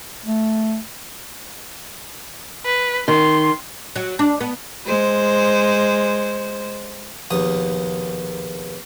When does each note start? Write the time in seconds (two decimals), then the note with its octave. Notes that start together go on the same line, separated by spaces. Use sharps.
0.25 A3
2.65 B4
3.08 D#3 C6
3.96 F#3
4.19 D4
4.40 B3
4.86 G#3 C5
7.30 A#1 D#2 B2 D#6